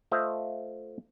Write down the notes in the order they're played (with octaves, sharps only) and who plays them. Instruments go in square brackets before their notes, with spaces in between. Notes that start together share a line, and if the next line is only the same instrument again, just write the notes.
[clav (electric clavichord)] A3 F4 C5 D#5 E5